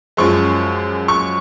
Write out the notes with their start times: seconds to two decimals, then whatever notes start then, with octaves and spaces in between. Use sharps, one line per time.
0.17 F#2 F3 G#3 C#6
1.08 C#6